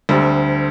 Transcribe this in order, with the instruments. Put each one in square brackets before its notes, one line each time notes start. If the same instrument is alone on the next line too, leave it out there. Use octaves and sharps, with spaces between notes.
[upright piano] D2 D3 G3 C4